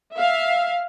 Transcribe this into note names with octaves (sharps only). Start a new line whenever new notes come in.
E5 F5